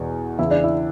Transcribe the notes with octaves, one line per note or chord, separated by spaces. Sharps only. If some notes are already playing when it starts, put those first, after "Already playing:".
Already playing: E2 B2
E2 C#3 E3 E4
D4
E4